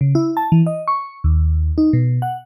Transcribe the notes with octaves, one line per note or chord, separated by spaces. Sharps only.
C#3
E4
A5
E3
D#5
C#6
D#2
D#4
B2
F#5